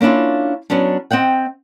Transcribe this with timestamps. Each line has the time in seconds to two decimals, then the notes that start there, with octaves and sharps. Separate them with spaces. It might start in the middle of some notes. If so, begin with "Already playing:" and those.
0.01 A#3 C#4 D4 E4 F4
0.70 F#3 B3 C#4 D4
1.11 C4 D#5 F#5 G5